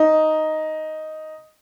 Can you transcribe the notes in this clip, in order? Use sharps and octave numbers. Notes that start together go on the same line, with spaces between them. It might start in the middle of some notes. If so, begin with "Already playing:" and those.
Already playing: D#4